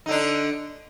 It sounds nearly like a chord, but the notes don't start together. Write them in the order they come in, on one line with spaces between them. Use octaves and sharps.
D#4 D3 D4